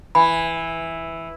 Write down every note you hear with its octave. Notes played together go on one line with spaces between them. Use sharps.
E3 B5